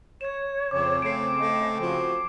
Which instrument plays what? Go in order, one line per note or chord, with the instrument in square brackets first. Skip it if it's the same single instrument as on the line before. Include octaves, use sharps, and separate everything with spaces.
[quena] C#5 [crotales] G#6 E7
[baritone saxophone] F2 [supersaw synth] C#3 C4 [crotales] D6
[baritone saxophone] A3 [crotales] C7 D7
[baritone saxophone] A3 [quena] D#5
[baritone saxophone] F3 [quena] F#4